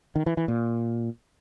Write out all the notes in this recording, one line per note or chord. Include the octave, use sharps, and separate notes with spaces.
D#3
E3
E3
A#2